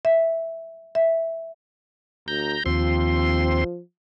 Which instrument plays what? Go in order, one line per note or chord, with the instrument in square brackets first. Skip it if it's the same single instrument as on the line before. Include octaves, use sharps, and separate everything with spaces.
[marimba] E5
E5
[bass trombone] D2 [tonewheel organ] A#5 G6
[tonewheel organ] D#2 C4 C6 [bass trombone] F3